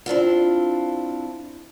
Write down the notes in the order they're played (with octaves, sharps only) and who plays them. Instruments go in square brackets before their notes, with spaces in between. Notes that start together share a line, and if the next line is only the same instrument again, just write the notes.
[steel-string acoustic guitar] C4 D4 E4 F4